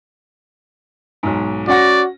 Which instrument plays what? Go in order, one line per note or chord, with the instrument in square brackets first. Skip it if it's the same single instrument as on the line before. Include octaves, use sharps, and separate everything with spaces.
[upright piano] B1 G#2
[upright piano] C#4 F#5 A#6 [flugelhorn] F#4 [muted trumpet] D5